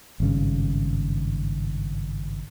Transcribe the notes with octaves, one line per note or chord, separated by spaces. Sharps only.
G#1 G2 C#3